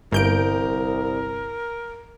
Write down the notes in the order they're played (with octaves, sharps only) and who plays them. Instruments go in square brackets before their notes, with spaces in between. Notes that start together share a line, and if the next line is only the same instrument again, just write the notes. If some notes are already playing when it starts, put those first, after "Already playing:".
[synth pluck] G1 G6 D7 [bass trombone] C2 [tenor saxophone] A#4